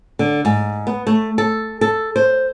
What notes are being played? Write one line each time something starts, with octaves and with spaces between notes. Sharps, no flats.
D3
G#2
B3
A3
A4
A4
C5